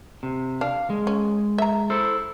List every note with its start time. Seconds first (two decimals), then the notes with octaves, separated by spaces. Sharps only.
0.23 C3
0.61 D4 F5
0.90 G#3
1.07 C#4
1.58 E5 A#5
1.90 E4 A4 C5